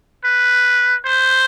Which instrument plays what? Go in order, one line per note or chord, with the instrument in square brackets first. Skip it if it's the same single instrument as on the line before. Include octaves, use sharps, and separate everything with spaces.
[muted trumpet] B4
C5